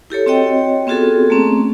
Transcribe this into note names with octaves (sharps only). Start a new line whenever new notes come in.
E4 G4 A4 C#5
C4 F#4 C#5 D#5 G5
B3 C4 F4 F#4 G#4 A4
A3 A#3 C4 C#4